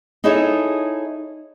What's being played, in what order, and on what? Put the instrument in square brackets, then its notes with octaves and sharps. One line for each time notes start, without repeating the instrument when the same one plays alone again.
[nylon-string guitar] D#4 E4 G#4 A4 C#5 E5